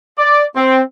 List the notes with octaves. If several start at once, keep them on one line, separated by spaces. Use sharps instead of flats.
D5
C4